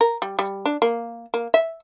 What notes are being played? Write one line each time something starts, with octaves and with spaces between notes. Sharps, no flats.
A#4
G3
G3
D4
A#3
A#3
E5